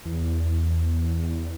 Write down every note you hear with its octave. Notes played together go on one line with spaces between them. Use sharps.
E2